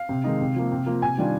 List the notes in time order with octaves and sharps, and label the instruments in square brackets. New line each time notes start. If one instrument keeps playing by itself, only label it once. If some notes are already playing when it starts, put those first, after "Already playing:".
Already playing: [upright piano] F5
C3
D#3 G#3 D#4
C3
F3 A#3
C3
F3 A#3 F4
C3 G#5
D#3 G3 D4 F4